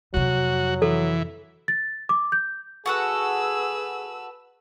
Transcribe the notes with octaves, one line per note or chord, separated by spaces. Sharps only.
F2 C3 F#3 F#4
E3 A4
A6
D6
G6
F#4 G#4 A4 B4 F#5 E6